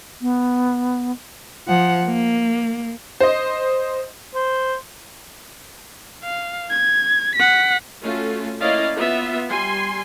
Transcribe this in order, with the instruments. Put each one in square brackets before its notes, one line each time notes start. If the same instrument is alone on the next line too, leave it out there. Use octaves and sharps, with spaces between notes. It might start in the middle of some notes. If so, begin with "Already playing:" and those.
[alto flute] B3
[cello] F3 F#5
A#3
[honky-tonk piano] C5 D#5
[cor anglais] C5
[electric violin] F5
G#6
F#5 B6
[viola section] A3 C#4 F4 F#4
A#3 C#4 E4 D5 D#5 F5
B3 F4 E5
G3 G#5 C6